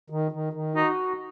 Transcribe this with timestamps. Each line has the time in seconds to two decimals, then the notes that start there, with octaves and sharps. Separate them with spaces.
0.10 D#3
0.32 D#3
0.53 D#3
0.75 D#4 F#4